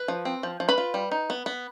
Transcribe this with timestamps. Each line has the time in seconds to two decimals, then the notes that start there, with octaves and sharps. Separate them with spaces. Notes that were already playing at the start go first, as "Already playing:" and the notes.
Already playing: B4
0.08 F3
0.25 C4
0.43 F3
0.60 F3
0.69 B4 B5
0.78 F4
0.94 G3
1.11 D#4
1.30 B3
1.46 B3